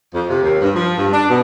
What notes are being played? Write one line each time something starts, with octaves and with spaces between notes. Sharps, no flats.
F2
C3
D#2
G2
F3
G2
D4
B2